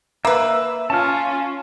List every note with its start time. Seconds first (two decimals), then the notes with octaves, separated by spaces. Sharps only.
0.25 A#3 B4 E5
0.90 C#4 F4 A5 F6